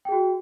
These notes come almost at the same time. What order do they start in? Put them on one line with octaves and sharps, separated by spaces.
G5 G#4 F#4